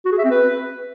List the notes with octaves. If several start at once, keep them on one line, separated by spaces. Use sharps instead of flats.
F#4
G#4
E5
C4
B4